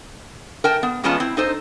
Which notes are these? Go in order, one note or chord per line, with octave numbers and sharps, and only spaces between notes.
A#4 G5 A5
B3
E2 G#3 B3 C#4 F4 A5
C4 E4
D#4 A4 C5